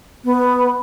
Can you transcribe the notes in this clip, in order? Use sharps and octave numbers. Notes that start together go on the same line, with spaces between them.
B3